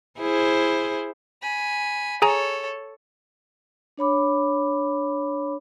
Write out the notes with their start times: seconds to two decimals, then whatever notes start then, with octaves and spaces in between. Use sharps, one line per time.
0.19 E4 G#4 C5
1.42 G#5 B5
2.22 G#4 A4 C#5 G#5 A#5
3.98 D4 C#5 B5 D6